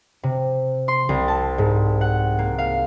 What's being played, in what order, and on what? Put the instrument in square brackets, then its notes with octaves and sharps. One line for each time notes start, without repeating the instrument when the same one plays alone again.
[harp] C3
C6
C2
A5
G#2
F#5
A#3
F5